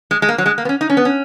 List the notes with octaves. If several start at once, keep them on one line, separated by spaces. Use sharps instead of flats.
G#3
G#3
A#3
F#3
G#3
A#3
B3
C#4
D#4
C#4
B3
C#4